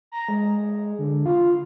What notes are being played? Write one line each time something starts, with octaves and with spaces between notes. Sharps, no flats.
A#5
G#3
D3
F4